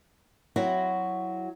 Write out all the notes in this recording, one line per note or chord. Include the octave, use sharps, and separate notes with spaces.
F#3 C4 E4 F#4